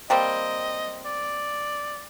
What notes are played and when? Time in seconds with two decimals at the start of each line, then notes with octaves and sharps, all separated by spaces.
0.10 G3 A#3 C4 D#5
1.05 D5